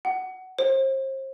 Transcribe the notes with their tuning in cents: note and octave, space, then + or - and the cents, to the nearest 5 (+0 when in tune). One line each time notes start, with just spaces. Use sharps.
F#5 +15
C5 +35